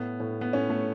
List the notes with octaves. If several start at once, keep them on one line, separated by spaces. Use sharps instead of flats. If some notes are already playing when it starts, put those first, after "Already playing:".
Already playing: A2 B3
A2
B3
A2 C#4
A3